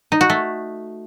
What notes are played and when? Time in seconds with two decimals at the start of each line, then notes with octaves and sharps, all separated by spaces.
0.12 D#4
0.21 F#4
0.30 A3